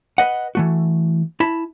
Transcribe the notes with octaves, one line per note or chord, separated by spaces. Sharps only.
B4 D#5 F#5
E3 A3 F#4
E4 A5 B5